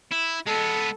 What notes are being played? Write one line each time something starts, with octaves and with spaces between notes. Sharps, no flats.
E4
G#3 B3 A4